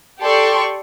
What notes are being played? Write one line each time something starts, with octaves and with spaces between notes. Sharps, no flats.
G4 A4 D5 C6 C#6